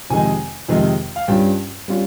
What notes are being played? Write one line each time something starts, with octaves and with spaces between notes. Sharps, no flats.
F2 C3 D#3 G#3 D#4 G#5
F2 C3 D#3 G#3 D#4
F5
G2 G3 C#4 F4 G5
G3 C#4 F4